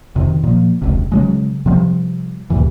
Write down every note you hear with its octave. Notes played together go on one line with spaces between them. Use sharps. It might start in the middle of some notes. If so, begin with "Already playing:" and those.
F2 C3 D#3
A#2 F3
E1 C#2 C3
C#3 F#3 G#3
C3 F3 G3
D2 G2 A#2 E3